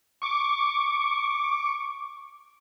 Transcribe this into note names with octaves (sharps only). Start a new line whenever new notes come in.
C#6 D6